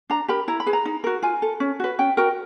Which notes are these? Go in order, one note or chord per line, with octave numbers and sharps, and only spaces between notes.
D4 A#5
G4 A#4 B5
E4 A#5
B5
G#4 B4
A#5
D#4
F#4 A#4
F4 G#5
A4
C#4
F#4 B4
C#4 G5
F#4 A#4 G5